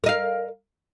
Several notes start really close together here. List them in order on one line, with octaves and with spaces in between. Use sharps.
A#4 D#5 F5